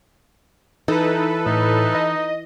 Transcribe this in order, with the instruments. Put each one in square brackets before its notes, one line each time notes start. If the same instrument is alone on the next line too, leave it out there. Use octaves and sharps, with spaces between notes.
[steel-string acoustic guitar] E3 [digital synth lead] D#4 [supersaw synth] A4 B4
[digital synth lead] A2 [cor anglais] D#4
[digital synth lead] D#5